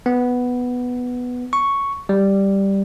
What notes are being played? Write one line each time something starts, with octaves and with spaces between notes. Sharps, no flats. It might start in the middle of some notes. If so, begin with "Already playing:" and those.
B3
C#6
G3